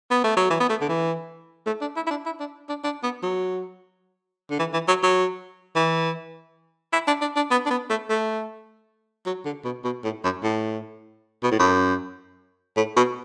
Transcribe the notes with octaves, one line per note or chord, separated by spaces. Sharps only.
B3
A3
F#3
E3
B3
A3
D3
E3
A3
D4
E4
E4
D4
E4
D4
D4
D4
B3
F#3
D3
E3
E3
F#3
F#3
E3
E4
D4
D4
D4
B3
D4
B3
A3
A3
F#3
D3
B2
B2
A2
F#2
A2
B2
A2
F#2
A2
B2